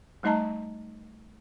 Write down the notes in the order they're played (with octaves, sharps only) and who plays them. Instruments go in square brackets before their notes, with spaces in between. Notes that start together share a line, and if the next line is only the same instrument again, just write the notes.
[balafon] G3 A3 D#4 D#5 A5 A#5